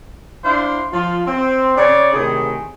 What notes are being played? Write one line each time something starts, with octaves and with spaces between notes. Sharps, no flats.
D4 E4 C5 F5 C6
F3 F4
C4
C#3 C#4 C#5 D5
A2 C3 D#3 G#4